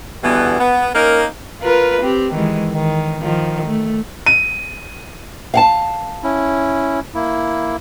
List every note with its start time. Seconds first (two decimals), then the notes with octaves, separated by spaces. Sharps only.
0.23 B2 D3 E3 G3 B3
0.60 B3
0.95 A#3 C#4 D#4 A#4
1.62 F4 A#4 B4
2.02 C4 G4
2.32 D#3 E3 G#3
2.73 D#3
3.22 D#3 F3
3.66 A3
4.26 D#7
5.54 F5 F#5 A5
6.24 C#4 E4
7.15 A#3 E4